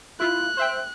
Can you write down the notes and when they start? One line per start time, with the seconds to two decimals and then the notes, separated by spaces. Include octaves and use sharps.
0.20 E4 F4 F#6
0.57 C5 E5 G5